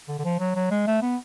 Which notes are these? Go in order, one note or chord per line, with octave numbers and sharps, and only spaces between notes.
D3
D3
F3
F#3
F#3
G#3
A3
B3